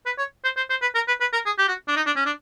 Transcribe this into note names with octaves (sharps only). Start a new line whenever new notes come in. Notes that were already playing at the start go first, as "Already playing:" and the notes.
B4
C#5
C5
C5
C5
B4
A#4
B4
B4
A#4
G#4
G4
F#4
D4
D#4
D4
C#4
D4